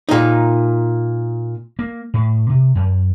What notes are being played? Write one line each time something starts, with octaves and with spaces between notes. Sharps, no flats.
A#2 D#4
A#3
A2
C3
F#2